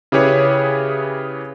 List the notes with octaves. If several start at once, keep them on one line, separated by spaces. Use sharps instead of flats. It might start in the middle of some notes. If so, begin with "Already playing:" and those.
C#3 E4 G4 G#4 B4 C#5